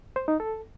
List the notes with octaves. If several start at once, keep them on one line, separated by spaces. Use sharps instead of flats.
C5
D#4
A4